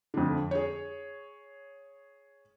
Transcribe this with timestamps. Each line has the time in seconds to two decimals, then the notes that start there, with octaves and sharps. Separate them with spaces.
0.14 F2 D3
0.51 G#4 C#5